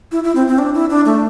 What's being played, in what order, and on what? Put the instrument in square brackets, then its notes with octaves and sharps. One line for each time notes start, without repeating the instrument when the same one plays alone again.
[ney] E4
E4
C4
C4
D4
E4
D4
A3